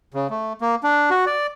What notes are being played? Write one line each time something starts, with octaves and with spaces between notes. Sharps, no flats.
C#3
A3
A#3
D4
F#4
D5